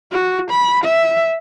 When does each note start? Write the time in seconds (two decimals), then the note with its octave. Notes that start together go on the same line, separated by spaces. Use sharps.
0.12 F#4
0.51 B5
0.84 E5